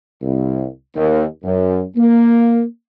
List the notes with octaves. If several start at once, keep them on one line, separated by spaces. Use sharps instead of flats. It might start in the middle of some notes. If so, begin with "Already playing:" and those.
C2
D#2
F#2
A#3